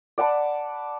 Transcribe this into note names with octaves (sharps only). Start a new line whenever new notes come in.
D5 F#5 A5 B5